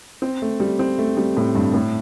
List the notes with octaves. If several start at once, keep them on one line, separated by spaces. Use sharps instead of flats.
C4
A3
G3
C4
A3
G3
A2
G2
A2